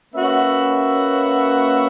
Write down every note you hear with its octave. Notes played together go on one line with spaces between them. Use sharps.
A#3 C#4 F#4 B4 E5